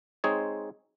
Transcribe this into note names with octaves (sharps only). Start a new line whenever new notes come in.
G#3 C4 D#4 G#4 C#5